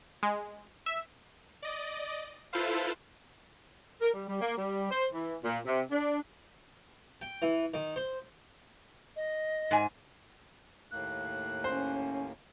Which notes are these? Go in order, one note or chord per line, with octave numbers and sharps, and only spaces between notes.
G#3
E5
D5 D#5
E4 F4 A4 B4 C5 F5
A#4
G3
G3
A#3
G3
C5
E3
A#2
C3
D4
G5
E3
D#3
C5
D#5
G#2 G#5
D#2 A2 A#3 F#6
C#4 C5